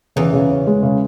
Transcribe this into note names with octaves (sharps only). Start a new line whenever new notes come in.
E2 C#3 E3
C#3
C#4
G#3
C#3